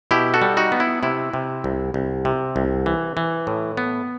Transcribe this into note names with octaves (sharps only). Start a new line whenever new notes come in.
B2 E4 G4
F#4 A4
G3
D#4 F#4
B3
E4
C3 E4
C3
C2
C2
C3
C2
E3
E3
A2
B3